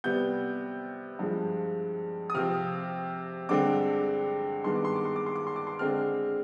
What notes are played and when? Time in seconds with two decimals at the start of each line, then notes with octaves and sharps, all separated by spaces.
0.04 C3 G3 B3 G6
1.19 G2 F3 G#3
2.30 D#6
2.34 C3 F3 C4 F6
3.49 G2 D3 G#3 C4 D6
4.64 G2 D#3 G#3 B3 C6
4.76 D6
4.85 C6
4.96 D6
5.05 C6
5.16 D6
5.26 C6
5.36 D6
5.47 C6
5.56 D6
5.67 C6
5.79 D3 G#3 C4 F6